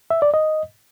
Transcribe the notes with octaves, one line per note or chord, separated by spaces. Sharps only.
E5
D5
D#5